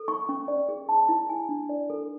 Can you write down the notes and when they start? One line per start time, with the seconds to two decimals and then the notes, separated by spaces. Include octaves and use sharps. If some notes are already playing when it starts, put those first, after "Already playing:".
Already playing: A4
0.08 C#6
0.29 C#4
0.48 D5
0.69 G#4
0.89 A5
1.09 E4
1.29 G#5
1.49 D4
1.69 D5
1.90 A4